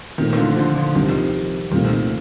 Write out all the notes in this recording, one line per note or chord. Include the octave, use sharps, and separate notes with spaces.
A#2 D#3 A3 C4 F4
D#3
D3 F3
D3 F3
D3 F3
C2 C3 D#3 F3
C2 A#2 D#3 A3 C4 F4